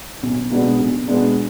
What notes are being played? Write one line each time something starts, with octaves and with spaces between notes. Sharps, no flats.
B1
B2 G#3 B3 D4
B1
B2 G#3 B3 D4